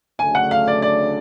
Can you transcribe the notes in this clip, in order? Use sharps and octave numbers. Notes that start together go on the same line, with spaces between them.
D2 C#3 F#3 A3 D4 G#5
F#5
F5
D5
D5